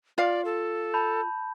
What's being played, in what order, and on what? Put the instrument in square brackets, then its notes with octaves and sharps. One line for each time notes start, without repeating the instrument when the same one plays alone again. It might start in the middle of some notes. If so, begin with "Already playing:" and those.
[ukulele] F4 F5 [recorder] D5
[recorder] A4
[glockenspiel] A5 B5 G6